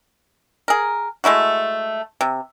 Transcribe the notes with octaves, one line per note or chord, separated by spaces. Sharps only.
G#4 A#4
G#3 A3 E4 F#4
C3